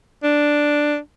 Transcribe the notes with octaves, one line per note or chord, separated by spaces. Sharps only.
D4